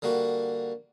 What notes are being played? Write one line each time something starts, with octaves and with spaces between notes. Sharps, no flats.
D3 G3 A#3 F#4